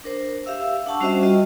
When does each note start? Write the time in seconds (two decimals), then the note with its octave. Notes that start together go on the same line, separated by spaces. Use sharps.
0.04 D4 A#4 C5
0.46 G4 E5 F5 E6
0.86 D4 F#5 A5 C#6 E6
1.00 G3 C#4 F#4 C5 D#5 E5
1.21 G3 F4 F#4 D#5